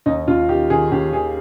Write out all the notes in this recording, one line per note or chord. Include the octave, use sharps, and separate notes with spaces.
D#2 D#4
D#2 F4
D#3 G4
D#3 G#4
D#2 G4
D#3 G#4